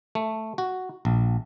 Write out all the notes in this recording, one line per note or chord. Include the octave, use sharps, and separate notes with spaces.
A3
F#4
A#1